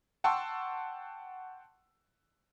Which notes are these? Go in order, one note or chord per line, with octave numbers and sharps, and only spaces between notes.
F#5 G5 A5 C6 C#6 E6